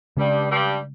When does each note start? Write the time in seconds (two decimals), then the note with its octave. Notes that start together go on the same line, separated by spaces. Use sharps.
0.17 G2 C#3 G3 G#3 C#4
0.49 G2 G3